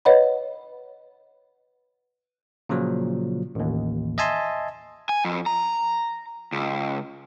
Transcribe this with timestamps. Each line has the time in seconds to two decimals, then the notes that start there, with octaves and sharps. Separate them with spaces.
0.05 B4 C#5 D#5 F#5 B5
2.69 A#2 C#3 F3 F#3
3.55 A1 D#2
4.18 D#5 E5 G#5 A5 C6
5.09 G#5
5.25 F2
5.46 A#5
6.52 C#2